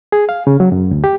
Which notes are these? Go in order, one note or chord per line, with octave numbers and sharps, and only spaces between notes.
G#4
F5
C#3
F#3
F#2
D2
G4